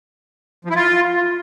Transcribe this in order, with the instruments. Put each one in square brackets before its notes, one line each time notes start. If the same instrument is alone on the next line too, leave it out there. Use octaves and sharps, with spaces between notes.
[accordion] F3
E4
F4